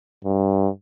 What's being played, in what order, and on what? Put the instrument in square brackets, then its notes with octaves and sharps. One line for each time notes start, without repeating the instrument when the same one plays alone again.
[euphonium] G2